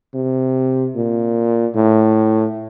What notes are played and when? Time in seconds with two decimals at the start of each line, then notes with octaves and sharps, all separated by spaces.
0.15 C3
0.96 A#2
1.76 A2